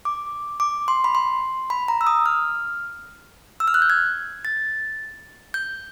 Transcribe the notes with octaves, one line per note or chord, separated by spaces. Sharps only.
D6
D6
C6
B5
C6
B5
A#5
E6
D#6
F6
E6
F6
F#6
G6
G#6
A6
G6